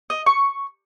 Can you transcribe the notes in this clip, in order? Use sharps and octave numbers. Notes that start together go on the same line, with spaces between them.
D#5
C#6